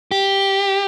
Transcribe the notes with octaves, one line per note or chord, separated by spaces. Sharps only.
G4